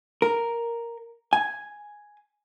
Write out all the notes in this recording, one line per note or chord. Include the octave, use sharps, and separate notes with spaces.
A#4
G#5